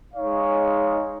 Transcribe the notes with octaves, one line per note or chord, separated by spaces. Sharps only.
G#3 D#4 C#5 F5